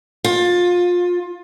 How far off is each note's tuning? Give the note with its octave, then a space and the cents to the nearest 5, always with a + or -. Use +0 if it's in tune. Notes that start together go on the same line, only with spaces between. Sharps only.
F4 +20